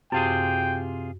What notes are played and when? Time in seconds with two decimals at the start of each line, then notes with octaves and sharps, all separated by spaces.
0.12 F#2 C3 F4 G#4 G5